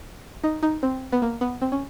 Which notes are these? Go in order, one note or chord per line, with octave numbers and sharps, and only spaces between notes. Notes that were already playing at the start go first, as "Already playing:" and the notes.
D#4
D#4
C4
B3
A#3
B3
C4
C#4